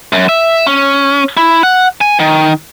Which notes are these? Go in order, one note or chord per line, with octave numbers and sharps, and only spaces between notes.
F#2
E5
C#4
E4
F#5
G#5
D#3